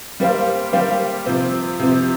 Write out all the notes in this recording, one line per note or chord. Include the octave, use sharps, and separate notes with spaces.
G3 A#3 G4 C5 F5
G3 A#3 G4 C5 F5
C3 F3 C4
C3 F3 C4